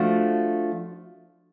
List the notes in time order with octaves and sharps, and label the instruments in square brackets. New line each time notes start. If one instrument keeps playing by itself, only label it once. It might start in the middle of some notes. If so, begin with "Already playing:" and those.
Already playing: [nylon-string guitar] F3 A3 D4 F#4